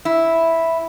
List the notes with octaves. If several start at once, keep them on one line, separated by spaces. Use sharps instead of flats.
E4